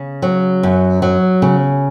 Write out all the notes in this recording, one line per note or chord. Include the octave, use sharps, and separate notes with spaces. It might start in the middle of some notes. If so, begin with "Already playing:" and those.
Already playing: C#3
F#3
F#2
F#3
C#3